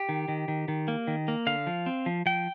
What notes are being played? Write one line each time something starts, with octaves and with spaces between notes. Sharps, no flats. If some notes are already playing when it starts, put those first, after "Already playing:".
Already playing: G4
D#3
D#3
D#3
D#3
A#3
D#3
A#3
D3 F5
F3
C4
F3
F3 G5